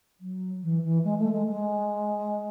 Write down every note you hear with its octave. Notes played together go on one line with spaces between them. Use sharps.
F#3
E3
E3
G#3
A3
G#3
G#3